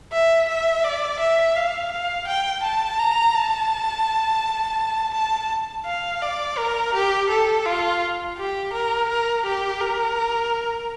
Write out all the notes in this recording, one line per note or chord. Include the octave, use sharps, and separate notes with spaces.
E5
E5
D5
E5
F5
F5
G5
A5
A#5
A5
A5
F5
D5
A#4
G4
A4
F4
G4
A#4
A#4
G4
A#4